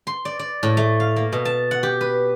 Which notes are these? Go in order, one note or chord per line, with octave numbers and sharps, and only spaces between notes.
C6
D5
D5
A2
A3
F5
A#3
B2
A5
F#5
G4
B4